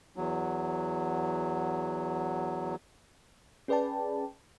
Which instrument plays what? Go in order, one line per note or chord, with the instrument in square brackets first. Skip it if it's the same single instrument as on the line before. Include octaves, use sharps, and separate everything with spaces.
[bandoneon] E2 F#3
[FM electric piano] C#4 G#4 B4 D5 G5 A5